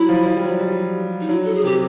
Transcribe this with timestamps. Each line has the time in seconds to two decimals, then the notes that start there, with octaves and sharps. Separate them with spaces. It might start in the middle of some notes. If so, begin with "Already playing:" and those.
Already playing: F#3 E4
0.09 F3
0.26 F3
0.36 G3
0.43 F#3
0.60 G3
1.21 D#4
1.29 F#3 E4
1.45 A4
1.55 G#4
1.63 C3 G4